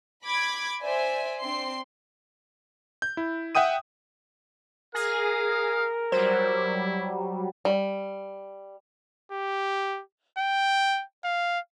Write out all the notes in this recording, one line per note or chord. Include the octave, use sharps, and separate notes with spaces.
B5 D6 G#6
C5 D5 E5 G#5
C4 D4 C6 C7
G6
E4
E5 F#5 G5 D#6 D#7
G#4 A#4 F5 A#6
F#3 G3 E4 C5
G3
G4
G5
F5